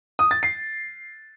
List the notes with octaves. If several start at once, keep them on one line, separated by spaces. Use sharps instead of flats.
D#6
A6
C7